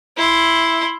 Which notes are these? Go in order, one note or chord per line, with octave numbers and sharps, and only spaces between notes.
E4 C6